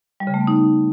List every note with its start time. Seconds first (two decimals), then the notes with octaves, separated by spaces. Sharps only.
0.20 G3
0.27 C#3
0.34 A3
0.41 B3
0.47 D#4